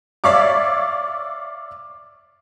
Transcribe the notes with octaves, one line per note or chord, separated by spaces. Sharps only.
C#5 D5 E5 F5 C#6 D6